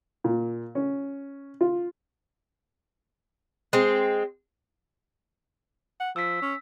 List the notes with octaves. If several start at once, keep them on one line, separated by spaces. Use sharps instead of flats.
A#2
C#4
F4
G#3 C4
F#5
F3 E6 B6
C#4